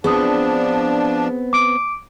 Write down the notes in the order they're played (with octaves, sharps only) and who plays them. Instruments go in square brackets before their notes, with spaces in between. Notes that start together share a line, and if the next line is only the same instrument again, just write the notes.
[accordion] F3 D4 [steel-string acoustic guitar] B3 C4 [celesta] G#4 D#6
[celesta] D6 D7